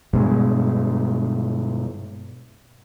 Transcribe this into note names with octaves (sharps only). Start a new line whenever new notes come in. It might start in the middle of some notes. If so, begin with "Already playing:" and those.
G2 B2 G#3